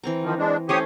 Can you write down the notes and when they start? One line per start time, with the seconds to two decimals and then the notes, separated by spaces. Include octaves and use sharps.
0.04 E3 C4 A#5
0.23 D#3 F3
0.38 G#3 D4
0.69 A3 C#4 G4 C5 C#5 D#6